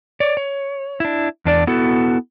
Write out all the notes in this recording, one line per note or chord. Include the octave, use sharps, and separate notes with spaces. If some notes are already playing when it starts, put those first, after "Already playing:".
C#5 D5
C#5
D4 E4
E2 D4 D5
B3 E4 F#4 A4